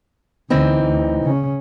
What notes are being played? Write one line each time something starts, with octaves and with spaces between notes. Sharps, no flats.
D2 D3 E3 C4 D#4
D2
C#3 C#4